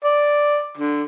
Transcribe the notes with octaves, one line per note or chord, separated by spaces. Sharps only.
D5
D3